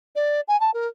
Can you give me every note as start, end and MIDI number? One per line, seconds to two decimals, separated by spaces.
0.16 0.41 74
0.48 0.59 80
0.60 0.71 81
0.74 0.87 70